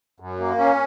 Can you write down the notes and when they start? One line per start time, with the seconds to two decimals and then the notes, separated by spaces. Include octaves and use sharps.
0.20 F#2
0.40 A#3
0.58 C#4